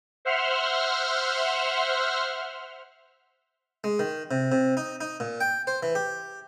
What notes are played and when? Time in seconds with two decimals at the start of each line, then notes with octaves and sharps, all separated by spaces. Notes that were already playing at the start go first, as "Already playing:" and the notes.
0.25 C5 E5 F#5 C6 F6
3.84 G#3
3.99 D#3
4.31 C3
4.52 C3
4.77 D#4
5.01 D#4
5.20 A#2
5.41 G5
5.67 C5
5.83 E3
5.95 G4